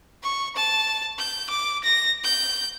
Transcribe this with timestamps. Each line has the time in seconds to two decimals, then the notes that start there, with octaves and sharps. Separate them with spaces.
0.23 C#6
0.56 A5
1.19 G6
1.50 D6
1.84 A#6
2.24 G6